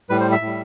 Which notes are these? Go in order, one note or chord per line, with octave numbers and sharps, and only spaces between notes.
A2 G3 B4
C5
E5
A2
G3